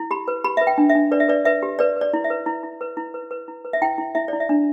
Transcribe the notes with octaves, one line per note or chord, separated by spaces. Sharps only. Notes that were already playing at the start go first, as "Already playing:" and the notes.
Already playing: E4
G4 B5
B4
G4 B5
B4 E5
G5
D4
E5
D4
B4 D5
E5
B4 D5
B4 E5
G4
B4 D5
B4 D5
E4
E5
B4
E4
E4
B4
E4
B4
B4
E4
B4
E5
E4 G5
E4
E4 E5
E4 D5
E5
D4